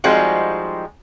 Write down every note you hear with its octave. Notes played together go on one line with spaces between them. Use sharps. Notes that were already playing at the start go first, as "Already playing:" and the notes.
F3 G3 G#3 C4 D#4 F#4